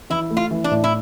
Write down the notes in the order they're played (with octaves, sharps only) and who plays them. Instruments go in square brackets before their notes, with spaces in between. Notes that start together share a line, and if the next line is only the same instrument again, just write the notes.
[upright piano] E3 [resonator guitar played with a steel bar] E4
[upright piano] A3
[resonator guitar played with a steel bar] F4
[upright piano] E3
[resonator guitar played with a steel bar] D4
[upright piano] A2
[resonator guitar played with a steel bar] E4